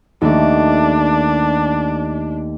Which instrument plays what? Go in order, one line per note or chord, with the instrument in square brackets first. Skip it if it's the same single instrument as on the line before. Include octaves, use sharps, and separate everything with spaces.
[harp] D#2 A3 [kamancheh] D4